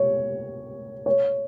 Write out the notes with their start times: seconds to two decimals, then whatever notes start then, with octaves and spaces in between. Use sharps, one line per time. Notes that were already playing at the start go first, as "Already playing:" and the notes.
Already playing: C#5
1.06 C#5